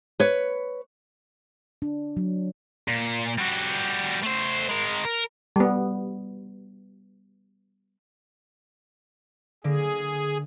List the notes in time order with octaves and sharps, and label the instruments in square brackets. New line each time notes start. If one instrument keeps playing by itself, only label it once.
[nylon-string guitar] B4 C#5
[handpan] D4
F#3
[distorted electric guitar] A#2
G3 F#4
A3 C5
G#3 A#4
A#4
[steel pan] G3 B3
[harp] D3 A#3 [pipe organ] G#4